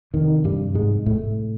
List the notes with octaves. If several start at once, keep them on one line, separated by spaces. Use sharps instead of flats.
F2 C3 D#3
G2 G3
G#2 G#3
A2 A3